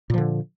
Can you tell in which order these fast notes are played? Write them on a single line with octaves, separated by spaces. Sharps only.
A#2 F3 D3